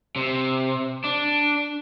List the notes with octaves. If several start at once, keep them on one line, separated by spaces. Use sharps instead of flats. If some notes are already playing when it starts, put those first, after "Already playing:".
C3
D4